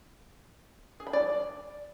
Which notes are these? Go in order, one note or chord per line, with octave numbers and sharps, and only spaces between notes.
G#4
B5
D5